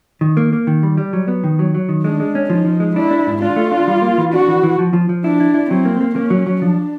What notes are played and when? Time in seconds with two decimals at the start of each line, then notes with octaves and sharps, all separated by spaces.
0.21 D#3
0.37 A#3
0.53 A#3
0.67 D#3
0.83 G3
0.98 G3
1.13 F#3
1.28 B3
1.44 D#3
1.59 F#3
1.74 F#3
1.89 D#3
2.04 G#3 D4
2.20 G#3
2.35 C#4
2.50 F3 D#4
2.65 F3
2.80 G#3
2.96 D4 E4
3.11 D4
3.27 G#2
3.42 D4 F4
3.56 A3
3.72 D4
3.88 G3
4.02 A#3
4.18 E3
4.33 D4 F#4
4.48 E3
4.63 E3
4.79 F3
4.93 F3
5.09 F3
5.24 D4 E4
5.40 E4
5.54 E4
5.70 F#3 C4
5.85 A#3
6.01 A#3
6.15 A#3 C#4
6.30 F#3
6.47 F#3
6.62 F3 D4